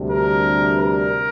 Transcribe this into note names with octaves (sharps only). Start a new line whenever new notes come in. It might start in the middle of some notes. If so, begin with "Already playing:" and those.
Already playing: D2 C3 G3 D4
A#4
A#4